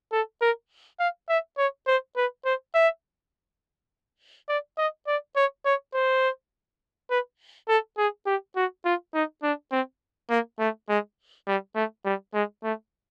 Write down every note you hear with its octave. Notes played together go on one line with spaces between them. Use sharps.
A4
A#4
F5
E5
C#5
C5
B4
C5
E5
D5
D#5
D5
C#5
C#5
C5
B4
A4
G#4
G4
F#4
F4
D#4
D4
C4
A#3
A3
G#3
G3
A3
G3
G#3
A3